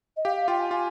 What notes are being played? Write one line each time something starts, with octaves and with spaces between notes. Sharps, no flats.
D#5
G4 F5
F5
F4 G5
G#5
F4 G#5